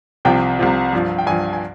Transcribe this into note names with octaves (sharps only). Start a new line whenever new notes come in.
C2 C3 F3 G5
C2 C3 F3
G2 F3
G5
G2 F3 G#5
G#5